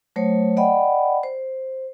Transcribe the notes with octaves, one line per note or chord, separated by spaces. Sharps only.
F#3 A3 C5 C#5
D5 D#5 F#5 G5 B5
C5